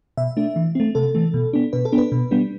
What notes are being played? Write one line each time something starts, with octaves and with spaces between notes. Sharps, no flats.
B2 E5
A3 D4
E3
A3 C4
C3 A4
E3 A3
B2
B3 D4
B2 B4
A4
B3 D4
B4
B2
G3 B3 D4